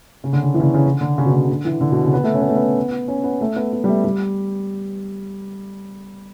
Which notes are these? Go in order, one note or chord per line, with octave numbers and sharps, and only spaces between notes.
C#3
D3
C#3
E3
C#3
D3
C#3
D3
D3
C#3
B2
C#3
D3
E3
D3
B2
C#3
B3
A3
C#4
B3
A3
B3
C#4
B3
A3
B3
B3
G3
A3
G3